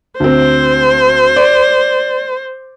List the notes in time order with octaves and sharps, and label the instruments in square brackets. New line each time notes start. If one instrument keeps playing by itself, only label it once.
[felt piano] D2 C4 [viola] C5
[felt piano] D5